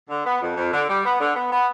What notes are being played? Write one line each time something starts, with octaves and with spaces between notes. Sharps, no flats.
D3
B3
F2
F2
D3
G3
B3
D3
B3
B3